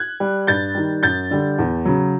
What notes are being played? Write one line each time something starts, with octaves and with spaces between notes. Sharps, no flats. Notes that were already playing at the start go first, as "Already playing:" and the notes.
Already playing: F#6 G#6
G3
G2 G6 A6
D#3 G3
F#2 G6 A6
D3 G3
E2
C#3 F#3